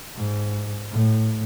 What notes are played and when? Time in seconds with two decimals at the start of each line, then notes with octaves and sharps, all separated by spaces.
0.16 G#2
0.91 A2